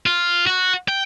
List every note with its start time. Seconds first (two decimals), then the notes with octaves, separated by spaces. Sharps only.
0.06 F4
0.46 F#4
0.88 G5